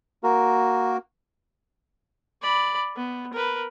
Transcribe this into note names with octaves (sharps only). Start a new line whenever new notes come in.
A#3 F#4 A#4
D5 B5
B3
A#4 B4